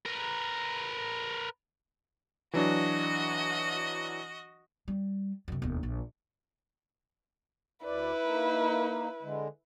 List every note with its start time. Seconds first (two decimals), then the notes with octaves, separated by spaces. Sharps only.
0.06 A#4 B4
2.53 E3 F#3 D4 F#4 D#5
4.88 G3
5.48 F#2 C3
5.62 E1 D#2
5.83 A#1
7.84 D2 E4 B4 D5
8.24 A#3 D#4
9.23 D3 G#3